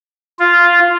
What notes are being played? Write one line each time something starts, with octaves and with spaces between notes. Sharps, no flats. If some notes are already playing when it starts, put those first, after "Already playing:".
F4